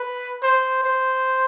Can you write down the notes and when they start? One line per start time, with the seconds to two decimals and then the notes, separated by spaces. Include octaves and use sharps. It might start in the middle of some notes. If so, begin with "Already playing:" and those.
Already playing: B4
0.43 C5
0.84 C5